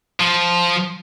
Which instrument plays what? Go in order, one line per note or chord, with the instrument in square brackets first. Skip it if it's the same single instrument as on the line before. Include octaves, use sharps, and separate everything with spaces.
[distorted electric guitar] F3